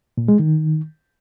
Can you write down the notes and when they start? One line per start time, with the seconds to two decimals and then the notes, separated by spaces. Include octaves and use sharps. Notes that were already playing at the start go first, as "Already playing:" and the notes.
0.18 A#2
0.28 G#3
0.39 D#3